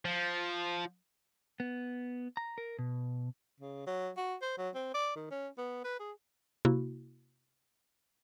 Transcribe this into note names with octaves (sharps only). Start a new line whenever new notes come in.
F3
B3
A#5
A#4
B2
C#3
F#3
F#4
C5
F#3
C4
D5
D#3
C#4
B3
B4
G#4
C3 A#3 E4 F#4